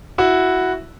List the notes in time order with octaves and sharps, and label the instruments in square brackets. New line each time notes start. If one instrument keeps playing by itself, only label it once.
[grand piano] E4 F#4